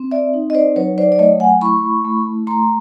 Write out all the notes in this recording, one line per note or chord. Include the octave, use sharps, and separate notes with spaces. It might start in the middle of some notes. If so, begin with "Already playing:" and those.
Already playing: C4
D5 E5
D#4
D#5
C5 D5
F#3 B4 C#5
C5 D5
D5
A3 C#5 D#5
F#5 G#5
E4 B5 C#6
A3
A3 A#5 C6